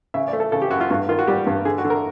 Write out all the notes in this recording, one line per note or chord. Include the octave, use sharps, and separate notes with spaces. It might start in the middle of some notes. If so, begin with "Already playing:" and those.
C#3 E5
D5
A3
A4
C#3 A4
G4
F#2 F#4
F4
G2 F#4
D#3 F4
F#4
G3 G4
G2
D3 G#4
F#4
D3
A#4